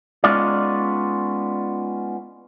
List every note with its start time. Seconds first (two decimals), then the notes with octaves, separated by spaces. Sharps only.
0.24 G#3 B3 C#4 D#4 F4 D5